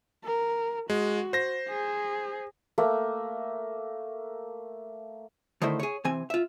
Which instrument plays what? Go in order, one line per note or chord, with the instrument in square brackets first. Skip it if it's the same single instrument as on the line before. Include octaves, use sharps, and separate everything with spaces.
[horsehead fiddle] A#4
[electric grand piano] G#3 [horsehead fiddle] F#4
[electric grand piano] C5 A#6
[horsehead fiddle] G#4
[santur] A3 A#3
[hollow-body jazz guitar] D3 D#3 A3 E4 C5
G#4 C#5
C3 E3 C4 G#5
F4 E5